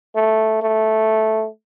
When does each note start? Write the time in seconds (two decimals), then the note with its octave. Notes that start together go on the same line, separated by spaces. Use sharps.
0.15 A3
0.62 A3